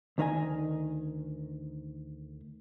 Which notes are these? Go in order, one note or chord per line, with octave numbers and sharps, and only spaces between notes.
D2 D#3 D#5 G#5